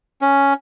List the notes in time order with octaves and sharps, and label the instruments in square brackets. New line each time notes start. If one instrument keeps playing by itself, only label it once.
[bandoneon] C#4